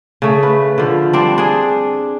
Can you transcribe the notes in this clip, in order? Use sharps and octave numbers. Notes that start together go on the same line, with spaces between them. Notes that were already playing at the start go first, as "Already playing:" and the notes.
C#3 A3
B4
D3 F3
G3 C4 D4
D4 G#4